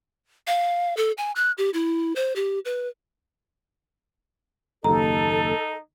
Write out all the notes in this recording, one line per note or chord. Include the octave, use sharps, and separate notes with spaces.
F5
A4
G#5
F#6
G4
E4
C5
G4
B4
F#1 D#2 D#4 A4 A#5